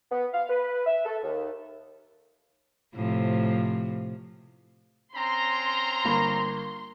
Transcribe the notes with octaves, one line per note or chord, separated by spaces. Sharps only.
B3
F5
B4
E5
A4
D#2
A2 C3 F3
C4 C#4 A#5 C6
G1 A#3 B5